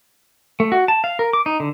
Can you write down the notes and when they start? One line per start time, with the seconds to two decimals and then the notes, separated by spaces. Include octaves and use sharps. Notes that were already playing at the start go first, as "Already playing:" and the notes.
0.60 A3
0.72 F#4
0.88 A5
1.04 F5
1.19 A#4
1.33 D6
1.46 D#4
1.60 D3